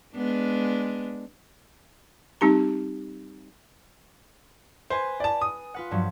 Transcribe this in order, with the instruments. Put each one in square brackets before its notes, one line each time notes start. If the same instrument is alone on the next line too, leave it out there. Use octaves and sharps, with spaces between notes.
[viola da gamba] G#3 B3 D4
[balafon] G3 C4 D#4 G4 A#5
[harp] B4 G#5 [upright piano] C5
[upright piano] D5 A5
D#6
[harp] F4 B4 F#5
G2 F3 F#3